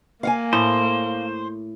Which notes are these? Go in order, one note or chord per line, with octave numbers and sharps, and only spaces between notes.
A#3 F5 F#5 G#5
A2 C5